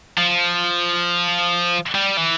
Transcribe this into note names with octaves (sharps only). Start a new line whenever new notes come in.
F3
G3
E3